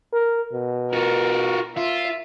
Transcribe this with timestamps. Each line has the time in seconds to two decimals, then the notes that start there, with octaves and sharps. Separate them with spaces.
0.13 A#4
0.53 B2
0.93 F4 F#4 A#4
1.77 F4 E5